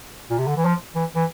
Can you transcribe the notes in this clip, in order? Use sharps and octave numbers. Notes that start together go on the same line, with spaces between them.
A#2
C3
D3
E3
F3
E3
E3